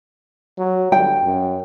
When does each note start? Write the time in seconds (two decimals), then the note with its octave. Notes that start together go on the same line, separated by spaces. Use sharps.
0.58 F#3
0.92 G1 G5
1.24 F#2